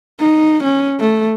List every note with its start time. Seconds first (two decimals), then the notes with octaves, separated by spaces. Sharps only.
0.20 D#4
0.64 C#4
1.00 A3